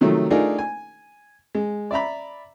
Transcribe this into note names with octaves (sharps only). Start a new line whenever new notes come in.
C3 D#3 F3 F#3 A3
A3 D4 D#4 F4 G#4 A#4
G#5
G#3
D5 E5 A#5 B5